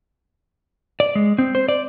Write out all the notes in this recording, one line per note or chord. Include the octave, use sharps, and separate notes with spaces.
D5
G#3
C4
C5
D5